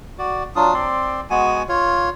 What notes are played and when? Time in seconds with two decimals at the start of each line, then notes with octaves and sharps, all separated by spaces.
0.18 F#4 D5
0.56 F#3 D4 F4 D#6
0.74 C4 D5 C6
1.30 G#3 B3 F#4 G#5
1.69 F4 C#5